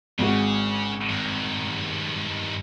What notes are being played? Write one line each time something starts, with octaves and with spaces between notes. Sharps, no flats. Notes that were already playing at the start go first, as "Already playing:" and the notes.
G#1 C#3 G#3 F#4
G2 D#3